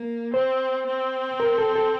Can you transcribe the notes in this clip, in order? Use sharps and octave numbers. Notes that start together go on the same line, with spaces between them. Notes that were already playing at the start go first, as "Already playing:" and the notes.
Already playing: A#3
C4 C5
C4
A#4
A4
A4